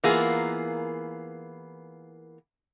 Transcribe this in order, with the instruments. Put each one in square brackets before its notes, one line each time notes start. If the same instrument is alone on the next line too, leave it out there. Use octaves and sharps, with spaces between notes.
[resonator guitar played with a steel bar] E3 A#3 B3 F4 G#4 A#4